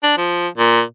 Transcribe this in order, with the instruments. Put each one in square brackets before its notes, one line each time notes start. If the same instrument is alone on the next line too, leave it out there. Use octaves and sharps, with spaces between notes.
[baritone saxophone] D4
F3
A#2